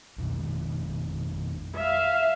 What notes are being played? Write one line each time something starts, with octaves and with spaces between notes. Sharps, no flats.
F2 B2 D#3
E5 F5